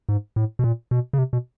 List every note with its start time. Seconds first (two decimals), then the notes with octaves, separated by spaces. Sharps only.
0.09 G#2
0.36 A2
0.59 B2
0.64 A#2
0.91 B2
1.13 C#3
1.18 C3
1.33 B2